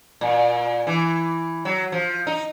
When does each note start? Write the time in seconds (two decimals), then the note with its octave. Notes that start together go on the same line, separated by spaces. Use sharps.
0.21 A#2
0.87 E3
1.65 F#3
1.92 F3
2.27 D#4